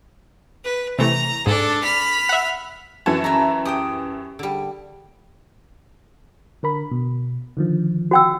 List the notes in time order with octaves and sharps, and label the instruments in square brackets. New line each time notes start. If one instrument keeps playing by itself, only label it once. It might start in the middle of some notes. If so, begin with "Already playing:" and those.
[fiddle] B4
[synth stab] C3 E3 A3 [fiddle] A#5
[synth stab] G#2 G#4 [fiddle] D4 A4
[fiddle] B5 F6
[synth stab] E5 F#5
[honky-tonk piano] F#2 E3 A5 [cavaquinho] C#5
[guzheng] E4 A4 G#5 [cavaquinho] A#5 B5
[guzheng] G4 G5 [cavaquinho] D#6
[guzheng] D3 G3
[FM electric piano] D3 A#4 B5
B2
D3 D#3 F3
[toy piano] F#4 G5 E6